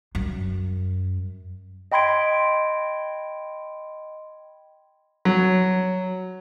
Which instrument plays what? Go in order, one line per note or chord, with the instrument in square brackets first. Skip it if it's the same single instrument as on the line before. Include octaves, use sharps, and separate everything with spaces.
[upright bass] F#2
[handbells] D#5 G5 B5 C6 G#6 D7
[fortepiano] F#3